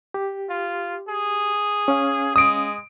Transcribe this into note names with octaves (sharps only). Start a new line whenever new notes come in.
G4
F4
G#4
C#4 F5
G#3 D#6 D7